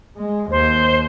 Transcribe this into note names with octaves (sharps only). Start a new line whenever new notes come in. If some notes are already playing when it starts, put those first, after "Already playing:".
G#3
D#2 C5